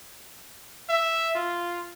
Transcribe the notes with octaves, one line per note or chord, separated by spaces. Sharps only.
E5
F4